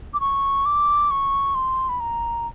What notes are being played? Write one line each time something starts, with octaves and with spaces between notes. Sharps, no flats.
D6
C#6
D6
C#6
C6
B5
A#5